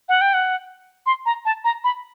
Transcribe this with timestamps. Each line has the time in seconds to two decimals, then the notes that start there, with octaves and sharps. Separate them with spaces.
0.09 F#5
0.21 G5
0.34 F#5
1.06 C6
1.26 A#5
1.45 A5
1.64 A#5
1.84 B5